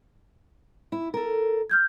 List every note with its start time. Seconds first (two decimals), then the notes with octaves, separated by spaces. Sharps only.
0.92 E4
1.14 A4 A#4
1.70 F6 G6 G#6